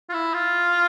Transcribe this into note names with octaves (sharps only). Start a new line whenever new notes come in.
F4
E4
F4